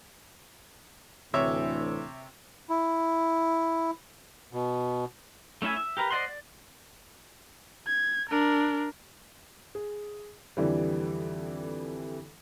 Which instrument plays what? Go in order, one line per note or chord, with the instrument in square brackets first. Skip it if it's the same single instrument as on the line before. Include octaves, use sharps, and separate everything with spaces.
[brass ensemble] D2 A2 E3 [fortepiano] C3 C#5 E5
[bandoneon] E4
B2
[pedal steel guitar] A3 C#4 E4 E5 G#5
E5
G4 A#4 B4 A#5
C5 D5 D#5 F#5 C6
D5
[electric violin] G#6
D4 A#4
[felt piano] G#4
F2 D3 E3 G3